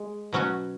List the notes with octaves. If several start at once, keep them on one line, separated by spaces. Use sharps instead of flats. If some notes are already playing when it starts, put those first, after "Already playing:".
Already playing: G#3
B2 F#3 C#4 F#4